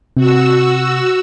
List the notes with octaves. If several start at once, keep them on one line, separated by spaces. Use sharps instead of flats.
C3 F#4 E6